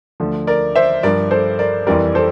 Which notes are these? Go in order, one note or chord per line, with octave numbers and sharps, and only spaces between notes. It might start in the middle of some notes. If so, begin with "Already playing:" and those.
D2 D3 F3
A#4 D5
C5 E5
G2 F3 A#4 D5
A4 C5
A#4 D5
F2 E3 G3 A#4 D5
A4 C5